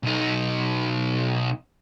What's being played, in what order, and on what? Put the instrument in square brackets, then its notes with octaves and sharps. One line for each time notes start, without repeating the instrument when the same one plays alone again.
[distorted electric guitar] B1 D#4